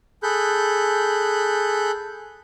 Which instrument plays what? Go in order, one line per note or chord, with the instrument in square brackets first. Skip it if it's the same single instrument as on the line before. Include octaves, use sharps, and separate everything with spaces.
[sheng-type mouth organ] G#4 A4 B5 F#6 G6